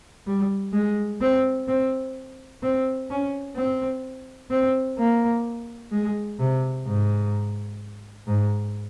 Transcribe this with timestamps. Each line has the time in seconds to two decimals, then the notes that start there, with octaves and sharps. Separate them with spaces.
0.27 G3
0.73 G#3
1.21 C4
1.68 C4
2.63 C4
3.10 C#4
3.56 C4
4.51 C4
4.98 A#3
5.92 G#3
6.40 C3
6.86 G#2
8.27 G#2